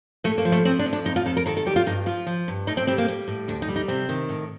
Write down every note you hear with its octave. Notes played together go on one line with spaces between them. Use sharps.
A2 A3
A#3
F3
A3
F3 C4
D4
A2
D4
F2 D#4
F4
F2 A4
A#4
D#3 A4
A4
G3 G4
F4
G2 D#4
F3 F4
F3
G2
A2 D#4
C4
G3 C4
A#3
G3
A2
D2 D4
D#4
G3
D#4
C3 C4
D#3
A2